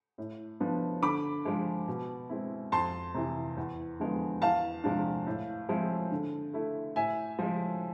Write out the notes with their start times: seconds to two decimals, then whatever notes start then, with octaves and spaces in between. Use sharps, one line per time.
0.18 A2
0.60 F3 B3 D4
1.02 D3 B5 D6
1.45 F3 G#3
1.88 B2
2.29 G#3 C4 E4
2.72 F2 A5 C6
3.14 C3 E3
3.57 E2
4.00 D3 F3 G#3 B3
4.41 E2 F5 A5
4.84 C3 F3 G#3 D4
5.27 A2
5.69 F3 G#3 C4 E4
6.12 D3
6.53 A3 E4
6.96 A2 E5 G#5
7.39 F3 G#3